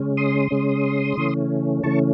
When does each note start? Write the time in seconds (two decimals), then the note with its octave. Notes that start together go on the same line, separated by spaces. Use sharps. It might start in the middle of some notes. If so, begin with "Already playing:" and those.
Already playing: C#3 G#3 C#4
0.17 C6 D#6
0.51 C#3 G#3 C#4
1.17 C#3 E3 A3 C#4
1.83 C#3 E3 A3 C#4 A5 C#6